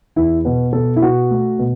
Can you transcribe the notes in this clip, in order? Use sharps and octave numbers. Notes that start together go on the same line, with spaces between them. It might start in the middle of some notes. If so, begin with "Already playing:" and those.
E2 E4
B2 B4
B2 A4
E4
B2 F#4
A3
B2